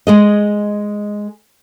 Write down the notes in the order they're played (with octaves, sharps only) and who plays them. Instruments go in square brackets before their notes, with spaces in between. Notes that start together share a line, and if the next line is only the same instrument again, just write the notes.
[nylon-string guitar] G#3 G#4 D#5